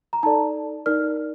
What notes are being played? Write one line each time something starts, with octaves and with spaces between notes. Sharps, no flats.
A#5
D#4 A4 D5 A5
D#4 A#4 D5 F6